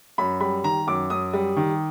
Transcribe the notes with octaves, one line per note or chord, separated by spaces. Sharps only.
F#2 B5
G3 B5
D#3 A#5
F#2 D6
F#2 D#6
G3
D#3